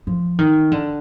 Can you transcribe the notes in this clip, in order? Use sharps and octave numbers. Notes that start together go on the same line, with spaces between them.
F3
D#3
D3